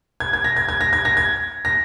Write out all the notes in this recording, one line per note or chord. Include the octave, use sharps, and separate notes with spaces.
G#6
G#6
A#6
G#6
G#6
A#6
G#6
A#6
G#6
A#6